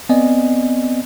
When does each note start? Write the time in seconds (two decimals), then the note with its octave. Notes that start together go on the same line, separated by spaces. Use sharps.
0.09 B3 C4 D5 D#5 G#5